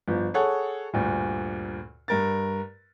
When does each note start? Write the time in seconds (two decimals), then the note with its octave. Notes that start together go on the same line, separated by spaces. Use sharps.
0.08 G1 F3
0.34 G#4 A4 C#5 F#5
0.93 D2 G2 A#2
2.08 G2 A#4 A6